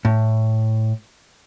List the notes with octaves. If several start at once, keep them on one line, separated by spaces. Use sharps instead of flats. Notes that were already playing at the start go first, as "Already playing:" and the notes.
A2